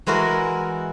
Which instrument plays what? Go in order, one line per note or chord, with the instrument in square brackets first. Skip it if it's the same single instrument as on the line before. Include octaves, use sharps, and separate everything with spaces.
[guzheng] E3 G#3 E4 F#4 A#4